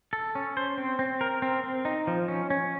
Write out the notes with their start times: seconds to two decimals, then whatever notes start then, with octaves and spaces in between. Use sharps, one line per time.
0.13 A4
0.35 C#4
0.57 C5
0.78 C4
0.99 C4
1.21 A#4
1.42 C4
1.64 C4
1.85 D#4
2.07 F3
2.28 C#4
2.50 C#4